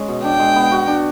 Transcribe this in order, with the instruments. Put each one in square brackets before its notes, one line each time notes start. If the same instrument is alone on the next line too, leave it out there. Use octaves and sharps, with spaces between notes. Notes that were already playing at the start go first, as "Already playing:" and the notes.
Already playing: [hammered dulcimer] G#3 C#4
B2
[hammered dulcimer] D4 [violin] G5
[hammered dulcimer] G#3
B3
F#4
D4